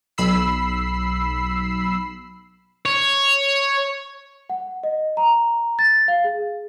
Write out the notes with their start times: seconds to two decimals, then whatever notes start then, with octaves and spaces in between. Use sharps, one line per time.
0.18 B1 B5 E6 C7
2.86 C#5
4.50 F#5
4.83 D#5
5.17 A#5
5.79 A6
6.08 F5
6.24 G#4